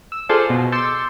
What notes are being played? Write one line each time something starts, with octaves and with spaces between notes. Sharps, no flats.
E6
F4 G#4 A4 C5 D5 F5
B2
C6 D6 E6 G6 A6 C#7